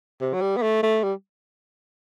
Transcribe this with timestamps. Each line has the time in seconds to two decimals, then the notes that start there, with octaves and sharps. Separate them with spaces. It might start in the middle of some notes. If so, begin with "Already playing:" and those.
0.21 C3
0.34 F#3
0.41 G3
0.57 B3
0.62 A3
0.83 A3
1.04 G3